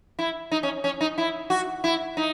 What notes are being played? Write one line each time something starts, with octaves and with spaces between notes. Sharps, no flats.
E4
D#4
C#4
C#4
D#4
E4
F#4
E4
D#4